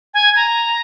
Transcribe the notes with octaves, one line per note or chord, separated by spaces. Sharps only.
G#5
A#5